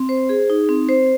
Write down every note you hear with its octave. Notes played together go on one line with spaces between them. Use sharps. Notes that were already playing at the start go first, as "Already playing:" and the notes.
Already playing: C4
C5
G#4
D#4
C4
C5